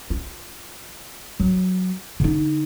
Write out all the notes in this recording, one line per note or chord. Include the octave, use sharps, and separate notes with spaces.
F4
F#3
D3 D#4